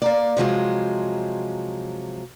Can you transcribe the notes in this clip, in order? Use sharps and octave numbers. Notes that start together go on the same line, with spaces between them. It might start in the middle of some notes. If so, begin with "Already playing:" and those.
A#3 D5
C3 F3 F#3 G#3